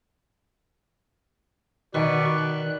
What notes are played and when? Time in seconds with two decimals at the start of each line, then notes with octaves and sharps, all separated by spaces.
1.94 B2 D#3 B4 D5 C#6
2.38 F#6